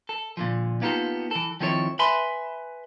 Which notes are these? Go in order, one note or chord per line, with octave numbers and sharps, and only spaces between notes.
A4
A#2 D3 F3
A#3 B3 D#4 F4 G4 A4
E3 A4
D#3 F3 C4 E4 A4 C#5
B4 E5 G#5 B5 C6